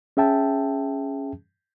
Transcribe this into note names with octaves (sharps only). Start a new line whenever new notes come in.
C#4 G#4 E5 G5 A5